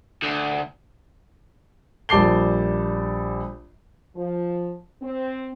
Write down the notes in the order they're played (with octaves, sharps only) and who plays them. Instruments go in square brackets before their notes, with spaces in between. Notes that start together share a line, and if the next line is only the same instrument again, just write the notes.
[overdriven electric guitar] D2
[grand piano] A#1 G3 A5 D6 C7 G7
[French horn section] F3
C4